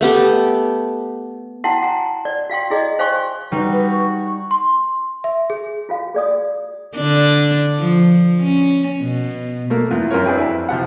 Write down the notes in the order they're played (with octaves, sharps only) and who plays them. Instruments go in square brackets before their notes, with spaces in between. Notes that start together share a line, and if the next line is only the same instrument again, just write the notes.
[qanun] A3 B3 G4 A4
[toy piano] E4 F#4 F#5 G5 A5 C6
F#5 G#5 A#5
D5
F#4 F5 G5 C6
E4 G#4 D5 D#5
C5 F5 G5 G#5 C6 C#6
[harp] G3 D#4 [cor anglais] F#4 [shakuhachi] B4
[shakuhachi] B4
C#6
C#6
[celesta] C6
E5
G#4
[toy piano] F4 F#4 F5
G#4 D5 D#6
[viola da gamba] D3 D4
F3
C#4
B2
[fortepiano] A3 A#3 A#4
E2 F4
F#2 F4 A#4 C#5
D4 E4 G#4 B4 G5
F2 E4
C2 F3 F#5